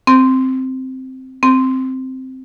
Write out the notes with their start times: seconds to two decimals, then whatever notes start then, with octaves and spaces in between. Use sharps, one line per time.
0.07 C4
1.43 C4